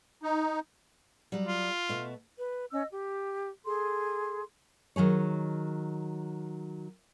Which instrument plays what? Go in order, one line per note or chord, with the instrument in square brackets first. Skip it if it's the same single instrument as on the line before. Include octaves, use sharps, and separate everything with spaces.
[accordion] D#4
[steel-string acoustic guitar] F#3 G3
[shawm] F4
[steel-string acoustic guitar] B2 A3
[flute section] B4
C#4 D#5 E6
G4
G#4 A4 C6
[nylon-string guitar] D#3 F#3 G#4 C#5